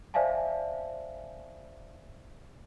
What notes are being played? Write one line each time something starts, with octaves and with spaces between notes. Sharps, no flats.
C5 D5 E5 F5 G#5 A5